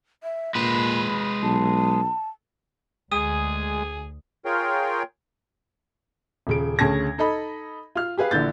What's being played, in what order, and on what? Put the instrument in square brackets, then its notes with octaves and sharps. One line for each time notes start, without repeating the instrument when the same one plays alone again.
[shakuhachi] E5
[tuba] A#2 [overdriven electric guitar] G#3 B4 [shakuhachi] B5
[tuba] B1 [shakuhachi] A5
[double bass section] D2 [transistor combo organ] G#3 [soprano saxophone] G#4 [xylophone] D#6 D#7
[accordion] F4 G#4 A#4 C#5 G5
[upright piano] D#1 C#3 D7
D2 C#3 C#4 A5 G#6 A#6
D#4 A4 D#5 B5
F4 F6
G4 G#4 B4 F5
A#1 D3 E3 G6 A6